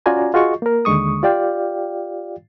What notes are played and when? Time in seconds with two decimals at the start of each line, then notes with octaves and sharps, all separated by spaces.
0.06 C#4 F4 F#4 D5 G#5 A#5
0.34 F4 F#4 G#4 D#5 C#6
0.62 A#3 A#4
0.85 D#2 D3 G#3 C#6 D#6
1.23 F4 G4 D5 F5 G5